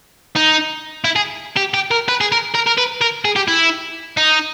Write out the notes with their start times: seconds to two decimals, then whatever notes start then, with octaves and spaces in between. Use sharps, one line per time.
0.36 D#4
1.04 E4
1.16 G#4
1.57 G4
1.74 G4
1.91 A#4
2.08 B4
2.21 G#4
2.32 A#4
2.55 A#4
2.67 A#4
2.78 B4
3.01 A#4
3.25 G#4
3.36 G4
3.48 E4
4.17 D#4